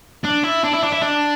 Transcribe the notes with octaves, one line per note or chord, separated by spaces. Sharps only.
D4
E4
D4
E4
D4
E4
D4